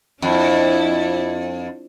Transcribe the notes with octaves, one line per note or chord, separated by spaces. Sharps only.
F2 D4 E4